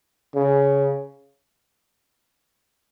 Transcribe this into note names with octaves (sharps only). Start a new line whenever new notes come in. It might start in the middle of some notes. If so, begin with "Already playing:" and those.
C#3